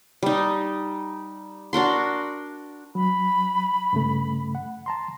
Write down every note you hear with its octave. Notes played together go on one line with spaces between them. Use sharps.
G3 D#4
D4 F#4 A#4 C6
F#3 B5
G2 C#3 A3
F#5
A5 A#5 C6